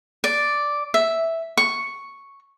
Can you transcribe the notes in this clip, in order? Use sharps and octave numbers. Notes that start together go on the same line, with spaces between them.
D5
E5
C#6